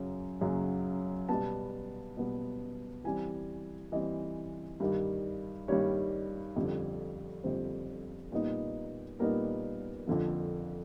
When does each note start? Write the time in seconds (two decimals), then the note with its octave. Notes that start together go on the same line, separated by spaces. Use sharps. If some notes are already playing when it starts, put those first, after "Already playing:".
Already playing: F#2 C#3 F#3
0.41 F#2 C#3 F#3
1.29 B2 G3 B3 A5
2.17 B2 G3 B3
3.04 E3 G3 C4 G#5
3.92 E3 G3 C4 D#5
4.80 G2 D#3 G3
5.68 G2 D#3 G3 C#5
6.56 F2 D3 G3 C4
7.44 F2 D3 G3 C4 C5
8.32 A#2 G3 B3 D#4
9.19 A#2 G3 B3 D#4 A#4
10.07 F2 D3 F3